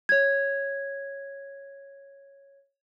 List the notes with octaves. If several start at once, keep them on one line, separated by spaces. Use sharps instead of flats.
C#5 G#6